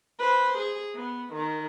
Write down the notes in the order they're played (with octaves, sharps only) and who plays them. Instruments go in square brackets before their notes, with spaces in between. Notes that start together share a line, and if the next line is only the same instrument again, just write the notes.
[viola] B4 C5
G#4
B3
D#3